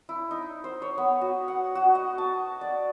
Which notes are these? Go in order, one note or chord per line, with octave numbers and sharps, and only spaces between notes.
E4
D#4
C5
C#5
B3
F#4
F#5
F#4
D#5
A5
D5